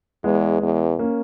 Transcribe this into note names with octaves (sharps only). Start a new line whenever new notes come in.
E2 G#3 B3
E2
A#3 C#4